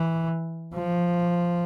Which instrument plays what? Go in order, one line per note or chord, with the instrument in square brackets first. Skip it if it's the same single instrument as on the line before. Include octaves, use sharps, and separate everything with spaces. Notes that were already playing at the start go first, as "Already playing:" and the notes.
Already playing: [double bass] E3
F3